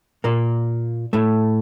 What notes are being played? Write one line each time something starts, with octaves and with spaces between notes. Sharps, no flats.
A#2 A#3
A2 A3